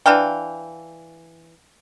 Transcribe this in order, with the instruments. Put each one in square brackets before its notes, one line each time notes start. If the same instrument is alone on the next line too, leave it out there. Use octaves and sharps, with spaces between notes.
[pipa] E3 D4 F5 G5